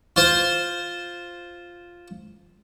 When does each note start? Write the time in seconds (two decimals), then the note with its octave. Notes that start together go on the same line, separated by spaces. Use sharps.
0.16 F4 C5